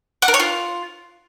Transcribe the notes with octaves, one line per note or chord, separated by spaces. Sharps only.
F#5
A#4
C#5
F4